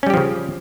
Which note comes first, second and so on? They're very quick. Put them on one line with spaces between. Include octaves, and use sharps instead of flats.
C#4 G3 G4 F3 C#3